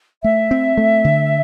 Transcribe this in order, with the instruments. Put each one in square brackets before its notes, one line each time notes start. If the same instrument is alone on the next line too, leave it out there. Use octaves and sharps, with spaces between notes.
[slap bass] A3 [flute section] E5
[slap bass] C4
A3
D3